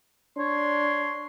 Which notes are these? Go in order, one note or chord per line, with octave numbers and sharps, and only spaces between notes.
D4 C#5 C6